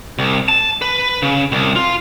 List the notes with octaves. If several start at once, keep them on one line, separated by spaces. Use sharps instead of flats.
C2
A5
B4
C#3
C2
F4